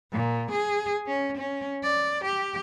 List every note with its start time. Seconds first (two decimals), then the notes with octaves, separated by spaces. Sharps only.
0.13 A#2
0.51 G#4
1.07 C#4
1.38 C#4
1.83 D5
2.24 G4